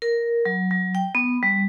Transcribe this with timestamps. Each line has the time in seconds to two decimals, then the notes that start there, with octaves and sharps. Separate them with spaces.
0.02 A#4
0.45 F#3
0.71 F#3
0.95 G5
1.15 B3
1.43 G3